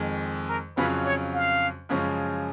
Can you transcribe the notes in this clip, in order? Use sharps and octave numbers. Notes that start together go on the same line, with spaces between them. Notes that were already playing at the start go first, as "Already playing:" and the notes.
Already playing: F2 D#3 G#3
A#4
F2 C#3 F#3 C#4 F4 B4
C#5
F5
F#2 C#3 F3 G#3 C#4